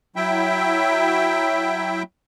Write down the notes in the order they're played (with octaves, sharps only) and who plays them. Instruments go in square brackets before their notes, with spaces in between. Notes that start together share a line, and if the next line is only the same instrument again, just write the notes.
[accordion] F#3 E4 E5 G5